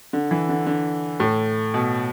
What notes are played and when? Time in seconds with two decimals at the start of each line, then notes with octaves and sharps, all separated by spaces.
0.13 D3
0.31 E3
0.49 D3
0.66 D3
1.20 A2
1.74 B2